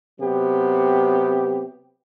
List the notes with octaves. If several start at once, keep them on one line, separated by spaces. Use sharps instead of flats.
C3 F#3 B3 G4